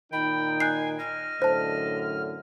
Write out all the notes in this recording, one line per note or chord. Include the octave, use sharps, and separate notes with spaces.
A#2 D#3 D#4 G5 B5
G#5 F#6 G6 C7
D#5 F6
F#2 A2 D3 C5 A5